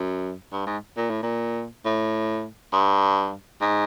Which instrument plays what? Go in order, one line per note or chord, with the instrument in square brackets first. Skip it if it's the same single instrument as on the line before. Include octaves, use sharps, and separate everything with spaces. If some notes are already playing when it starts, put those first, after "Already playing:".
Already playing: [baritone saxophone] F#2
G2
G#2
A#2
A2
A#2
A2
G2
G#2